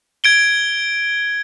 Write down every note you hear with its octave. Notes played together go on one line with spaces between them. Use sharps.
G#6 D7 G7